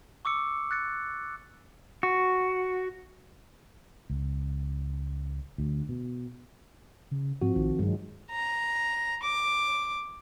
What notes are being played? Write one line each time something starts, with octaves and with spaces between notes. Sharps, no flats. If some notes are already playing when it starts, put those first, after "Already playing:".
C#6 D6 E6 C#7
F#6 A6 C#7
F#4
C#2
D2
B2
C#3
G#2 F3 C4 F#4
A#1 D#3
G2 F#3 G#3
A#5
D6